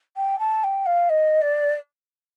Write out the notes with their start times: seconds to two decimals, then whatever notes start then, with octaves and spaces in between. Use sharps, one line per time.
0.17 G5
0.39 A5
0.64 G5
0.86 F5
1.09 D#5
1.41 D5